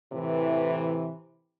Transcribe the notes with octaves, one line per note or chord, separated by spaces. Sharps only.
A2 C3 E3